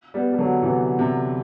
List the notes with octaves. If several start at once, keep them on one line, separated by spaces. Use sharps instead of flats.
G3 B3
G3
D3 F#3
C3 E3
C3